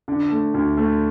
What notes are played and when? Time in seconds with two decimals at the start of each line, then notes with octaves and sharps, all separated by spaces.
0.08 D3
0.31 A3
0.54 D2
0.77 A3